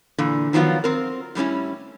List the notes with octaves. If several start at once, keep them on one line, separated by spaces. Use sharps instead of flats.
A#2 D3 E3
D#3 F3 F#3 B3 F4
C4 A#4
A2 G3 C4 C#4 E4